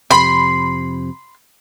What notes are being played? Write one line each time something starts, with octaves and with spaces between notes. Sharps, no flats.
F2 C3 B5 C6